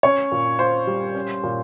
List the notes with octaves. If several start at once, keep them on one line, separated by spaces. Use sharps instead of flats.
C#4 C#5
A#2
F4 C5
G3
C#4
A#2